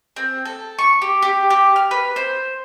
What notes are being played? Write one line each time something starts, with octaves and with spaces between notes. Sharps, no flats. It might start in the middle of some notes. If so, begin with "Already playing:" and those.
C4
A4
C#6
G4
G4
G4
F6
B4
C5